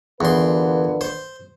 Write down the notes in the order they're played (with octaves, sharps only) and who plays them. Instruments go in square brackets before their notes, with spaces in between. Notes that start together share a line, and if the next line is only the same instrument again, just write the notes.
[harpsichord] E2 C6 [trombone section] A#2 D3 B4
[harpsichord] C5